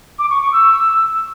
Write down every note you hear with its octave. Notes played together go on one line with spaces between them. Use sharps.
D6
C#6
C#6
E6